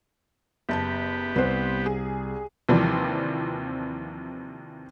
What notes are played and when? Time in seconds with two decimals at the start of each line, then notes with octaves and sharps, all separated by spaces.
0.69 F#1 B3 G4 A5 G6
1.36 C2 B4 C5
1.86 G#4
2.69 D#2 C3 E3 F3 G3 C4